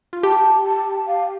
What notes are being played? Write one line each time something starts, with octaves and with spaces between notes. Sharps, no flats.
F4
G4 A5
A5
F5